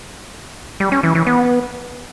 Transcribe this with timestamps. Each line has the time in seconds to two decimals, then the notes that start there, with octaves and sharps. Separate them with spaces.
0.80 G3
0.92 C#4
1.03 E3
1.15 E3
1.27 B3